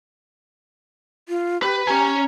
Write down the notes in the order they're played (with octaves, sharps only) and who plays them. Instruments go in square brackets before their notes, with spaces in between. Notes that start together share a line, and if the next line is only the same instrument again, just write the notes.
[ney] F4
[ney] G4 [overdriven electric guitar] B4
[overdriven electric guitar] C#4 G#5 [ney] G4 [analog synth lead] A#5